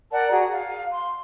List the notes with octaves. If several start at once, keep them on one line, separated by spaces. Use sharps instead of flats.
A#4 D5 F#5 A5
F#4 G#4 A#5
F5
C6